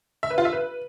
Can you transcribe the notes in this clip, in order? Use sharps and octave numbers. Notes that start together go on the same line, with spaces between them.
E5
B4
F4
E5
B4